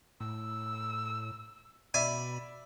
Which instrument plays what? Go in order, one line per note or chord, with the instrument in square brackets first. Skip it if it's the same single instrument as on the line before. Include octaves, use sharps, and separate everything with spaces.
[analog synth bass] A2 [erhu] E6
[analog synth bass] B2 [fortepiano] D5 E5 [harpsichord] G#5 [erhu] B5